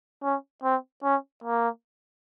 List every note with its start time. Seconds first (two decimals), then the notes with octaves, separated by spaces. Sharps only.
0.23 C#4
0.64 C4
1.04 C#4
1.44 A#3